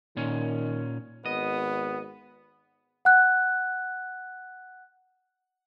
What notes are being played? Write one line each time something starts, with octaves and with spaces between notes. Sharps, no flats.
A#2 D#3 C#4
G#1 B3 D#5
F#5 F#6